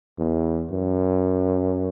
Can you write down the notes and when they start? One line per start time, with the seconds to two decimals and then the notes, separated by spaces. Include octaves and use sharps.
0.18 E2
0.71 F#2